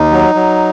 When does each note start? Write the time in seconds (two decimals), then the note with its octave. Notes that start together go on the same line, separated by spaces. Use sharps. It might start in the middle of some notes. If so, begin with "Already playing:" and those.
Already playing: D#2 D#4
0.11 F#3
0.35 F#3